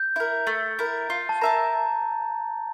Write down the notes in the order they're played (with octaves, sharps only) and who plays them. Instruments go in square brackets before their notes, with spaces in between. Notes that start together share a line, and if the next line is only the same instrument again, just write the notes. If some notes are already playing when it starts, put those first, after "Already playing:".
Already playing: [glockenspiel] G6
[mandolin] E4 A#4
[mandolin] A3 [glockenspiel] A6
[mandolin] E4 A#4
F4
[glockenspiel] A5
[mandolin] A#4 E5 A5 [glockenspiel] A#5